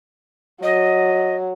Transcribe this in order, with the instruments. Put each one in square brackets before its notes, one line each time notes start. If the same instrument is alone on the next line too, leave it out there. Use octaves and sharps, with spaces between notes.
[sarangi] F#3 [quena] D#5